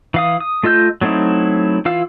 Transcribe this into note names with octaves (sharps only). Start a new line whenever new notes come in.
E3 F5 D#6
D#6
A3 F4 D#5 E6 G6
F#3 A3 C4 D#4 E4
E3 F4 F5 E6